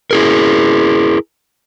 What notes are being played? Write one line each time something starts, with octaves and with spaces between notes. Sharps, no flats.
E4 G#4 A#4